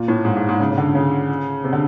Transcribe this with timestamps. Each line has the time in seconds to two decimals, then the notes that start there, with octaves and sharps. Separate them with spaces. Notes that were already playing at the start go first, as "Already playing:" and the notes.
Already playing: A#2
0.08 A2
0.24 G#2
0.37 G#2
0.49 G#2
0.60 C#3
0.71 C#3
0.78 D3
0.95 C#3
1.64 C3
1.72 D3